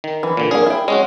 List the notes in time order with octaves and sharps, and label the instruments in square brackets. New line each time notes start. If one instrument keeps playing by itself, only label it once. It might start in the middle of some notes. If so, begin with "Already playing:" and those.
[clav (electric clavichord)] D#3
[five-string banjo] E3
[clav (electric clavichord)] A#2 D3
[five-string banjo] A#3 D4 [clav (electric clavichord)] G#4
[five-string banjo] E4 G5
[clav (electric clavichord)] G#3 C#4 F#4 [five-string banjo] D#5